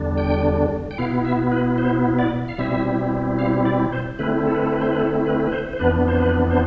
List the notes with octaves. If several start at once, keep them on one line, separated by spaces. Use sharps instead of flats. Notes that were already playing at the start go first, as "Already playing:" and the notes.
Already playing: E2 D3 G3 D4
G5
G5
B2 B3 E4 F5
E5
B4
C5
D5
F5
B2 G3 C4 E4 E5
F5
D5
C5
D3 A3 C4 E4 B4
A4
B4
A4
B4
C5
B4
A4
B4
B4
C5
C5
F2 E3 B3 D4 B4
C5
B4
C5